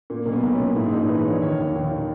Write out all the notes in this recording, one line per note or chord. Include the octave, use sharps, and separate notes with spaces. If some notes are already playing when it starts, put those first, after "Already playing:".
A#2 A#3
B1 A#3
B3
B1
C#4
A#2
G#2 E4
A#1 D#4
E3 B4
A#1 C#5
D#3 C#5
D#2
D#2
D#3